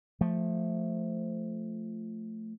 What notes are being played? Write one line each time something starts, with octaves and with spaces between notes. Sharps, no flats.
F3 A3